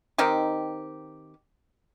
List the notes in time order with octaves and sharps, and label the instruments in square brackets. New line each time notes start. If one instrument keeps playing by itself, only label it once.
[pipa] D#3 C4 D#4 G4